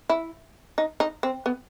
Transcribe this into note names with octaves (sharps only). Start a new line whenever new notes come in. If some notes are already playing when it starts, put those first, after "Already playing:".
E4
D#4
D#4
C4
B3